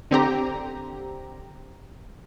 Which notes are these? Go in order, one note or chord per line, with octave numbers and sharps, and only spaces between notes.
D3 C4 G4 A#5